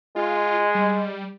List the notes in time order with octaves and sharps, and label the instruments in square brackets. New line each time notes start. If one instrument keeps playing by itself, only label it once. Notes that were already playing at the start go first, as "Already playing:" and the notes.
[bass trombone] G#3 [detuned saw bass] F4
[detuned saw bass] G3